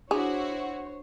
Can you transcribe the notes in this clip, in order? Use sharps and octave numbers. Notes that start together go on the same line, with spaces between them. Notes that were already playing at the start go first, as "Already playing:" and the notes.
D4 E4 F#4 G#4 C5 C#5 F#5